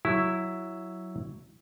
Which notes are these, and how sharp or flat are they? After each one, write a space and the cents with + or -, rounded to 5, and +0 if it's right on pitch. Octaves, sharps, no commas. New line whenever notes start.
F#3 +0 E4 +0